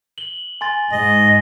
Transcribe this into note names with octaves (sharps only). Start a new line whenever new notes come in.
F#7 G7
G#5 C6 A6
G#2 D#5